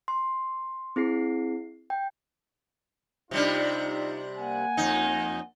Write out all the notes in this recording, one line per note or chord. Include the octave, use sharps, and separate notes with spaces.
C6
C4 E4 G#4 C7
G5
C3 G3 D4 D#4 F4
A#3 F#5 G#5
F2 D#4